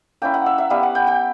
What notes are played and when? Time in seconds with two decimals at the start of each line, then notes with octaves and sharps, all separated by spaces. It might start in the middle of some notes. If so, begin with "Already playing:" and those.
0.22 A#3 C#4 E4 G5
0.34 F#5
0.46 E5
0.58 E5
0.70 G3 B3 E4 F5
0.83 F#5
0.95 G5
1.07 G5